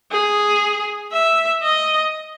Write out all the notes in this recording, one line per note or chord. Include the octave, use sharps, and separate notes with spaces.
G#4
E5
D#5